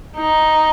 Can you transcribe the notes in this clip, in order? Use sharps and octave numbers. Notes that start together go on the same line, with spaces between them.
D#4